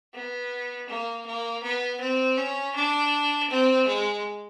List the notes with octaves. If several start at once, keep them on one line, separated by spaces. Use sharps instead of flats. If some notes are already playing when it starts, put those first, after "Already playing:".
B3
A#3
A#3
B3
C4
C#4
D4
C4
G#3